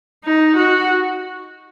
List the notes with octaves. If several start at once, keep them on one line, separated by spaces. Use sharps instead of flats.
D#4
F#4